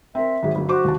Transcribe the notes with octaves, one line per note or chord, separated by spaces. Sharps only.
C4 A#4 E5
G#1 F#3 G#3
G1 F#3
F#4 C5 D6
D#2 C3 A5